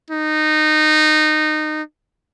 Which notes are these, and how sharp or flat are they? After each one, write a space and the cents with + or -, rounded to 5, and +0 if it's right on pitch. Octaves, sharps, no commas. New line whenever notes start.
D#4 -20